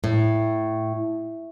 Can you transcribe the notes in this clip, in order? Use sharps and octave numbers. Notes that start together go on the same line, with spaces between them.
A2